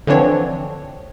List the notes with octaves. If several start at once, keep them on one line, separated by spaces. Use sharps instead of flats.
D3 E3 F3 C4 D4 C#5